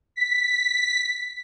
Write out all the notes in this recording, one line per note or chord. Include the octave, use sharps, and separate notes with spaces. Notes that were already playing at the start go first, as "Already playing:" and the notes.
B6